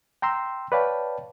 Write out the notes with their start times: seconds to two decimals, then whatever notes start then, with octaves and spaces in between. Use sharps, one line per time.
0.22 G5 A#5 C6 E6
0.72 B4 C#5 D5 F5 G5 A5